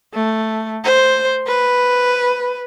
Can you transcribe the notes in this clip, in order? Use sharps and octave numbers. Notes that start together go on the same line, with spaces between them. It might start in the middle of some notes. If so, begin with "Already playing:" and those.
A3
C5
B4